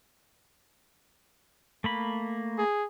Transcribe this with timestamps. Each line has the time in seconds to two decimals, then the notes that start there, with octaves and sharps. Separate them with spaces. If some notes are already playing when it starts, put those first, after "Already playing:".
1.84 A3 A#3 B5
2.58 G#4